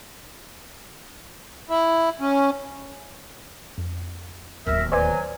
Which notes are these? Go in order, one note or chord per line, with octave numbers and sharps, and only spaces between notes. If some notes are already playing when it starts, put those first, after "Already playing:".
E4
C#4
F2
D1 D#2 A#4 E5
F#3 B4 C5 D5 G#5